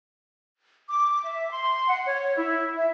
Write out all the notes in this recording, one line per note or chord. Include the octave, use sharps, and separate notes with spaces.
D6
E5
C6
F#5
C#5
E4
E5